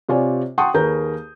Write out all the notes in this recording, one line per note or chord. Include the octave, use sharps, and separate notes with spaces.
C3 F4 C#5 D5 G#5
F#5 G5 A5 C6 C#6 D#6
D#2 G#4 A#4 B4 A#5 G6